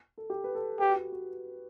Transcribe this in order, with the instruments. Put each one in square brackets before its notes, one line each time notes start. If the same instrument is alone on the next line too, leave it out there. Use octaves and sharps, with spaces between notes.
[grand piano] A4
G4
B4
A4
[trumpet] G4 [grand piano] B4
[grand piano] F#4
G4
F#4